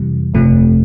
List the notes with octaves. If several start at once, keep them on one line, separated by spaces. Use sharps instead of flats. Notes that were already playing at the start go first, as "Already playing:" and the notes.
Already playing: F2 C3 E3 G3
G1 F2 C3 F3 A3